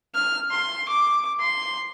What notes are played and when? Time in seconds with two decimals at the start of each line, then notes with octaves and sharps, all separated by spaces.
0.14 F6
0.51 C6
0.88 D6
1.40 C6